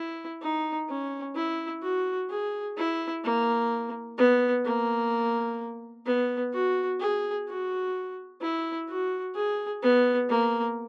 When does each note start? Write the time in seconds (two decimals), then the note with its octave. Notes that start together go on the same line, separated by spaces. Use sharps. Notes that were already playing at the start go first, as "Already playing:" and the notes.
Already playing: E4
0.42 D#4
0.88 C#4
1.35 E4
1.82 F#4
2.30 G#4
2.77 E4
3.24 A#3
4.18 B3
4.65 A#3
6.06 B3
6.53 F#4
7.00 G#4
7.48 F#4
8.41 E4
8.88 F#4
9.35 G#4
9.82 B3
10.29 A#3